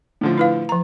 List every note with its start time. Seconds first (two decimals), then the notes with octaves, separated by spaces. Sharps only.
0.21 A2 D3 F3
0.38 E4 B4 F5
0.69 F3 A#5